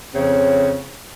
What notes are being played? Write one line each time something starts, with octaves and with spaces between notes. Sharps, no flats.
F2 C#3 C4 C#5